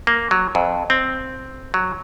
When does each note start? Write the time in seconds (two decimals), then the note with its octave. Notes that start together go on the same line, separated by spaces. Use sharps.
0.07 A#3
0.31 F#3
0.55 F2
0.90 C4
1.74 F#3